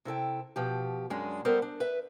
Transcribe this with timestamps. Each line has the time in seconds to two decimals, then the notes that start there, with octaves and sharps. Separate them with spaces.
0.05 C3 E4 A4 G5
0.56 B2 F3 G4
1.10 F#2 G#3 D4 G#4
1.45 G3 B3 A4 A#4 C5
1.62 D4
1.80 B4 E5